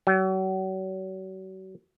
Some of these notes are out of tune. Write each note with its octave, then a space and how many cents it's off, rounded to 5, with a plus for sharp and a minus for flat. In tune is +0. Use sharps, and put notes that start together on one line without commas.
F#3 +40